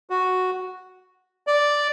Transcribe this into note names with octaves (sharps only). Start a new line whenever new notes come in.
F#4
D5